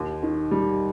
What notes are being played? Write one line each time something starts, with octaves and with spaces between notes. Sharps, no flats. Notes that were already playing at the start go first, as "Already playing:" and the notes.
Already playing: D#2
D#3
G3